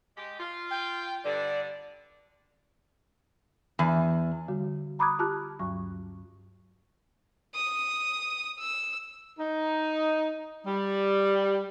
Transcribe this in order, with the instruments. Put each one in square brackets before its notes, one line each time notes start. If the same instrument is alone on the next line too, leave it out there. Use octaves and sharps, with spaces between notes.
[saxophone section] G#3 G4
F4
[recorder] G5
[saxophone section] G2 D3 [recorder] D5
[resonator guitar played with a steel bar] E2
[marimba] D3 G3 F#4
A#5 B5 D6 D#6 F#6 G#6
F4 G4 A5 D6 F6 F#6
D2 G2 F#3 C#6
[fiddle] D#6
E6
[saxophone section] D#4
G3